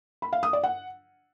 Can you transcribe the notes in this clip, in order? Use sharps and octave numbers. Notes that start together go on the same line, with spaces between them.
B5
F5
D#6
D5
F#5